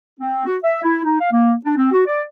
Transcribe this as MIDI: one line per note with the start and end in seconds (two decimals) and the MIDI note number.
0.20 0.43 60
0.45 0.56 66
0.63 0.79 76
0.82 1.01 64
1.04 1.18 63
1.20 1.30 77
1.31 1.53 58
1.65 1.72 62
1.76 1.88 60
1.92 2.03 66
2.06 2.22 74